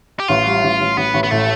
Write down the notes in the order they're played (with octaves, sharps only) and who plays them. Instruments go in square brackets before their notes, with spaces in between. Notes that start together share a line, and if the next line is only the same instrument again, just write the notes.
[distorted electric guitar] G4
[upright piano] A1 [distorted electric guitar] F4
[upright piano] G3
A1
A1
[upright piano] A1 [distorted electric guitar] B3
[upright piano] A1
[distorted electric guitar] B3
[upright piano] A2 [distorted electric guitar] A3